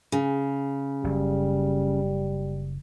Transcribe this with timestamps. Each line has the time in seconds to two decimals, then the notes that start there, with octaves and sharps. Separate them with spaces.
0.12 C#3
1.04 F#1 G3